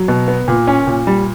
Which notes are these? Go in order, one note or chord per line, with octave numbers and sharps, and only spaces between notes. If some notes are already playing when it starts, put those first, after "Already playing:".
Already playing: F#3
B2
B3
A#2
C#4
A#2
G3